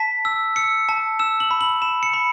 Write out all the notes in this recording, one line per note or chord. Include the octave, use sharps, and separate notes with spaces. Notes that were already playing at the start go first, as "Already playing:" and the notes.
Already playing: A5 B6
E6
E6 C#7
A5
E6 E7
F#7
B5
F#7
B5 E7
C#7
B5